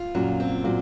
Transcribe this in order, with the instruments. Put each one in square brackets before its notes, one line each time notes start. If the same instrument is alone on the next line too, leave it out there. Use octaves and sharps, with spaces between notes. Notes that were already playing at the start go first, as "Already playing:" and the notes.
Already playing: [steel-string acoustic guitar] F4
[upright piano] F#2 A#2 [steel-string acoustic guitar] F#3
[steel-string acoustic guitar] C4
[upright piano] A#2 [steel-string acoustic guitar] F#3